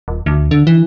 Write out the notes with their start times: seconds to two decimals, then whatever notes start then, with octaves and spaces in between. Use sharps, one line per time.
0.08 D#1
0.26 D2
0.51 D3
0.67 E3